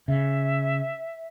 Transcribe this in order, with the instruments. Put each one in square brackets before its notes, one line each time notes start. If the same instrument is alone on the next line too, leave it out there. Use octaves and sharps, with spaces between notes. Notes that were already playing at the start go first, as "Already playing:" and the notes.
[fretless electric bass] C#3 [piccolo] E5